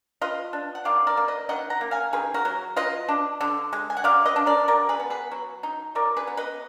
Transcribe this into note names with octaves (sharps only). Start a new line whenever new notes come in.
F4 B4 D#5
D4
F#5
D#3 D5 F5
A#4 D5
A#3
B4 D#5
D#3 D#5 F#5
F#5 A#5
A#3
F5 G#5
D#3 G#4 B4
F#4 A#4
F#3
F4 B4 D#5
D4
D3
G#3
G#5
F#5
F#3 D5 F5
B4 D#5
D4
A#4 D5
F#3 A#4 D5
G#4 B4
B3
G#4 B4
F#3
D#4
F#3 A#4 D5
G#4 B4
B3
B4 D#5